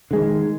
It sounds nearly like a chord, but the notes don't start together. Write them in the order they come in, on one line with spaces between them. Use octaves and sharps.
D3 G#3 D#3